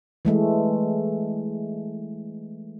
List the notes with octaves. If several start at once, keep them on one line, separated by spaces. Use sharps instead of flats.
E3 G#3 A3